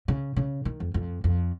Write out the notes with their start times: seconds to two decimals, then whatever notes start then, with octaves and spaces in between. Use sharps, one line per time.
0.08 C#3
0.36 C#3
0.65 D#3
0.80 F2
0.94 F2
1.24 F2